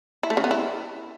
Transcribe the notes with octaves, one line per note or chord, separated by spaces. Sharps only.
E4
A3
C#3
B3
E4